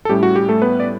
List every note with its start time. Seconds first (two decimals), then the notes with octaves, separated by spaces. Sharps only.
0.05 A4
0.09 A2 G3 C#4 G4
0.23 F#4
0.36 G4
0.49 A3 A4
0.62 B3 B4
0.80 D5